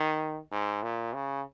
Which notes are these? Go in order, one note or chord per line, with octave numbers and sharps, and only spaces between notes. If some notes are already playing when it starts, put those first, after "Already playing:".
Already playing: D#3
G#2
A#2
C#3